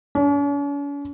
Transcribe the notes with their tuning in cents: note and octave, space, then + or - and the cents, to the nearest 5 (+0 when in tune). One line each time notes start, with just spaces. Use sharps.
C#4 +45